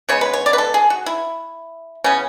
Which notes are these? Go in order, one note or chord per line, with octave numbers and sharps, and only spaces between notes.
C#3 G#3 B3 C#5
B4
C#5
D5
B4
A4
G#4
F#4
E4
C#3 E3 B3 C#4